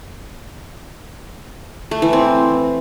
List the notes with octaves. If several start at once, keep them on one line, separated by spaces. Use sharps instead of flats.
A3
E3
C4